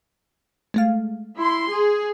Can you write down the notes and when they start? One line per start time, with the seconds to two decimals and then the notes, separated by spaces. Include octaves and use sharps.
0.74 G#3 A3 F5
1.37 E4 C6
1.72 G#4